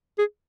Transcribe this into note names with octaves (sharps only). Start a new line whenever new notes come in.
G#4